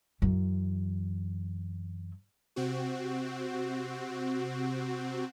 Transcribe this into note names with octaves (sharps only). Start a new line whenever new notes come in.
F#2 E3
C3 C4 F#4